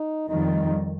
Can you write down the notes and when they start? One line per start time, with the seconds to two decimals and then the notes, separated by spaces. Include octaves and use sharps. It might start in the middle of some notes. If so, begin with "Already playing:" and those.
Already playing: D#4
0.29 F2 D#3 G3 D#4